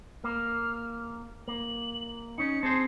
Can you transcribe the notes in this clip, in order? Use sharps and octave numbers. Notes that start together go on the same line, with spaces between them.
A#3 F6
A#3 F#7
C#4 D#4 C#7
C4 G#4 C5 A5